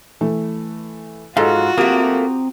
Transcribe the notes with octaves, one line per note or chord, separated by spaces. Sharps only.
E3 A3
G#2 F4 F#4 G#4 A4 D#5 F5 F6
A3 A#3 C4 G4 A#5 D#6